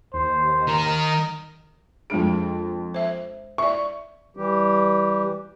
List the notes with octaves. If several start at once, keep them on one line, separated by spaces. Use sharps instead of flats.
D#2 C5
D#3 A#4
F2 G#3 D4 G#4 D7
C5 E5
D5 E5 C#6
E3 G3 G4